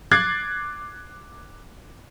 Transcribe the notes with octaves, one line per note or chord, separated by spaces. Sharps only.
D6 F#6 G#6 A6 C7